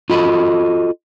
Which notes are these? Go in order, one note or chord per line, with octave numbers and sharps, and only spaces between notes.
F4 F#4 A4 D#5 B5